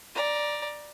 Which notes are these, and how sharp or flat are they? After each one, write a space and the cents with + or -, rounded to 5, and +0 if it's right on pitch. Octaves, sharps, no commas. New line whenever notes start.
D5 +5 A#5 +20